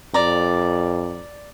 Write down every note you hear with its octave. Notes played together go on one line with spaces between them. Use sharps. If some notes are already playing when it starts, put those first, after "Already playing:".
F2 D5 A#5